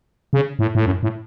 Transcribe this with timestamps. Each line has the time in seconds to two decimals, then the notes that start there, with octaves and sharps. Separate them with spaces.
0.33 C#3
0.59 A2
0.75 A2
0.86 F#2
1.03 A2